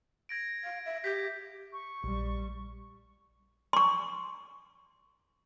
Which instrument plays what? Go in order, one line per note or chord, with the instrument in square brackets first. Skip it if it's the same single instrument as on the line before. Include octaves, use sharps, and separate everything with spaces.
[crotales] G#6 A#6 D7
[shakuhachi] F5
E5
[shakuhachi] G4 [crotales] G6 B6
[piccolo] C#6
[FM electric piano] A#1 [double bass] G3
[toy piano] C6 C#6